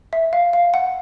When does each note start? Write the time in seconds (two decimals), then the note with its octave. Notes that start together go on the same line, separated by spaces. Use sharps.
0.13 E5
0.33 F5
0.53 F5
0.74 F#5